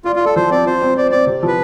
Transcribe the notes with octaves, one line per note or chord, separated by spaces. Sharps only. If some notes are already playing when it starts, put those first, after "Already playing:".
F4 D5
F4
A4 D5
F3 C5
C4 D5
F4 C5
C4
C5 D5
C4 D5
C3
F3 B4